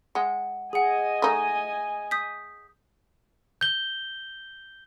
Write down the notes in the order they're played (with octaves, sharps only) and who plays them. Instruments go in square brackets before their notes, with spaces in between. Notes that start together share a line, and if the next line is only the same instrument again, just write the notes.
[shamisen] G#3 [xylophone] F#5
[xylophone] G#4 F#5 [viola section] D#5 G#5
[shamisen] A3 D#4
[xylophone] D#6 G6 B6
[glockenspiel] G6 G7